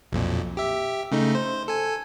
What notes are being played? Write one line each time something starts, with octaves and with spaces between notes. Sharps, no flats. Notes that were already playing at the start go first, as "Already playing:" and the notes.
B1 F2 A#2
G4 E5
C#3 A3 D#4
C5
A4 G#5